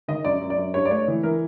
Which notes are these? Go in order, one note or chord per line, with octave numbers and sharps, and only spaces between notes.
D#3 D#5
F#2 D5
F#2
D5
F#2
G2 C#5
D5
A3 C#5
E3
E3 A#4